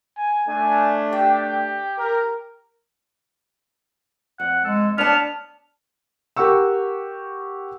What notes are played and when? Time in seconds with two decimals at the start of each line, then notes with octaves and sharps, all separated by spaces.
0.17 G#5
0.48 A3 D4 G#5
1.13 G4 G5
1.98 A#4
4.40 F2 F#5
4.64 G#3 A4
4.98 B3 D4 C#5 A5 F6
6.36 G4 A#4 F#5 C#6 E6